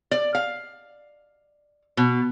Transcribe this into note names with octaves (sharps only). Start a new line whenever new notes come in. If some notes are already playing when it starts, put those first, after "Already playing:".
D5
F5
B2